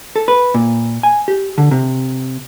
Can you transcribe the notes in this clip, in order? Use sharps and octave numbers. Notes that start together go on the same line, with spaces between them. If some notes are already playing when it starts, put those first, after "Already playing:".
A4
B4
A#2
G#5
G4
D3
C3